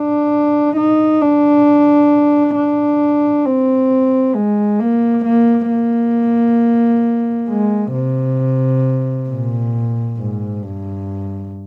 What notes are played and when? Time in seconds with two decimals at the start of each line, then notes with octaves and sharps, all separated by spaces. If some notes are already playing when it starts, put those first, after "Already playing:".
Already playing: D4
0.77 D#4
1.21 D4
2.56 D4
3.45 C4
4.35 G#3
4.80 A#3
5.25 A#3
5.70 A#3
7.49 G#3
7.93 C3
9.29 A#2
10.18 G#2
10.63 G2